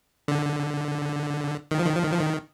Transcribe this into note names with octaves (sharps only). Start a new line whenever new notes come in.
D3
D#3
F3
D#3
F3
D#3
F3
D#3